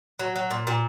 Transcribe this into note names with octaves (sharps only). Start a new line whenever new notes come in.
F#3
F#3
A#2
A#2